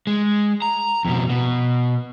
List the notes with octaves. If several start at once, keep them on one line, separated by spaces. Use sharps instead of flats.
G#3
A#5
F2 B2
B2